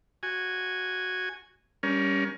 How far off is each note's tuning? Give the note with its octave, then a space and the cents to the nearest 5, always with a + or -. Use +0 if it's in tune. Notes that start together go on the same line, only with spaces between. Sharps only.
F#4 +0 G#5 -5
G3 +0 C#4 +20 A#4 +30